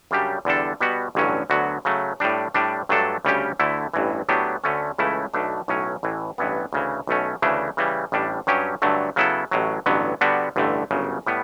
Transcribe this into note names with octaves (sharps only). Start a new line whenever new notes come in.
F#2 C#3 G3 D4 G4
E2 D3 G3 D4 A4
B2 G3 B3 F#4
A1 G2 D3 F#3 C#4
D2 D3 F#3 B3 F#4
C#3 F#3 A3
A2 G3 D4
A2 G3 D4
G2 F#3 A3 D4 A4
D2 C#3 G3 C#4 G4
D2 D3 A3 E4
A1 G2 E3
A2 F#3 B3 D4 G4
D2 D3 A3 C#4
C#2 C#3 E3 A3 E4
B1 B2 A3 D4
B1 A2 F#3 C#4
A1 A2 E3
A1 G2 E3 B3
D2 C#3 E3
B1 B2 A3 C#4
D2 C#3 E3 A3 D4
C#3 E3 G3
A1 A2 G3 D4
G2 F#3 C#4 G4
G2 D3 F#3 A3
C#3 F#3 B3 E4 A4
A1 A2 F#3
A1 G2 D3 F#3 B3
D3 G3 B3 D4 F#4
A1 G2 D3 A3
G1 F#2 C#3
A2 G3 B3